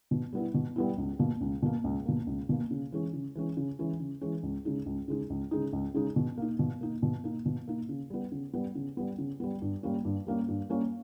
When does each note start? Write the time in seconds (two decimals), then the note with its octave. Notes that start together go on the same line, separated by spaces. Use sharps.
0.11 B2
0.33 G3 B3 E4
0.54 B2
0.76 G3 B3 E4
0.98 C#2
1.19 B2 A#3
1.41 C#2
1.62 B2 A#3
1.84 C#2
2.06 B2 A#3
2.27 C#2
2.49 B2 A#3
2.71 C#3
2.92 E3 G#3 C#4
3.13 C#3
3.35 E3 G#3 C#4
3.57 C#3
3.79 E3 G#3 C#4
4.00 C#3
4.21 E3 G#3 C#4
4.43 C#2
4.65 C#3 G#3 D#4
4.86 C#2
5.08 C#3 G#3 D#4
5.30 C#2
5.51 C#3 G#3 D#4
5.73 C#2
5.94 C#3 G#3 D#4
6.16 B2
6.37 A#3 D#4
6.59 B2
6.81 A#3 D#4
7.02 B2
7.24 A#3 D#4
7.45 B2
7.68 A#3 D#4
7.89 C#3
8.10 G3 B3
8.32 C#3
8.54 G3 B3
8.75 C#3
8.97 G3 B3
9.18 C#3
9.40 G3 B3
9.62 G2
9.83 G3 A#3 C#4
10.05 G2
10.27 G3 A#3 C#4
10.48 G2
10.69 G3 A#3 C#4